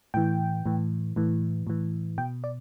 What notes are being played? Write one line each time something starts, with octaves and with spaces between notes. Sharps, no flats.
A2 E3 G5
A2 E3
A2 E3
A2 E3
B2 G5
D5